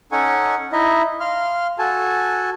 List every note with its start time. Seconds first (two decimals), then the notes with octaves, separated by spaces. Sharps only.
0.12 C#4 D#4 A4 F#5 G#5 C#6
0.72 D#4 E4 D#5 E5
1.20 F5 C6 F6
1.79 F#4 A4 G#5 A5